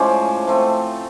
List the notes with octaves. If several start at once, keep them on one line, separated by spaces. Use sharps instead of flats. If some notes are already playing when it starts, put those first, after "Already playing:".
Already playing: A2 F3 G#3 C#4 C5 D5
F3 A3 C4